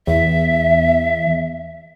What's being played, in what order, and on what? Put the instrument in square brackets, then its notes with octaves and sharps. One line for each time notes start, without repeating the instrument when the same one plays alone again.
[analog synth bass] E2 [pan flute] E5